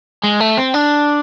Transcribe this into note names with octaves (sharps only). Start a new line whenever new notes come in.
G#3
A3
C4
D4